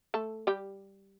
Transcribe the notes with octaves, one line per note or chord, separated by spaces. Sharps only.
A3 A4
G3 G4